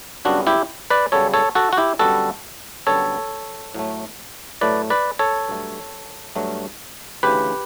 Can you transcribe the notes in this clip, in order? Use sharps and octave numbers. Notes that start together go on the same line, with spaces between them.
F#2 C#3 G3 B3 D4 F#4
E4 G4
B4 D5
F#2 C#3 G3 B3 A4 C#5
A4 C#5
F#4 A4
F#4
E4 G4
F#2 D3 G3 B3 F#4 A4
F#2 D3 G3 B3 A4 C#5
A2 F#3 A3
A2 F#3 A3 B4 D5
B4 D5
A4 C#5
G2 F#3 A3
G2 F#3 A3
D2 C#3 E3 G4 B4